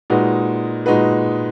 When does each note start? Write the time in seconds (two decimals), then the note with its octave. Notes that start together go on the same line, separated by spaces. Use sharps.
0.10 A#2 G#3 D#4 F#4 B4
0.86 A#2 G#3 D#4 F#4 B4